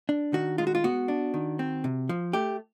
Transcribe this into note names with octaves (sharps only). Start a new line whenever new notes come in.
D4
D#3 F#4
G#3 F4
F#4
F4
B3 F#4
D4
D#3
C4
C3
F3
A3 G4